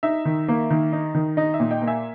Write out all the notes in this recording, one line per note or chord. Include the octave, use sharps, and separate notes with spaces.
D#4 E5
D#3
A#3
D#3
D#4
D#3
D#4 D#5
E5
A#2
D#5 G5
A#3
E5 G#5